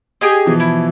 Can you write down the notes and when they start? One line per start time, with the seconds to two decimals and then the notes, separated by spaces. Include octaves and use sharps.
0.21 G4 G#4 D#5
0.46 B2 E3 F3
0.60 E4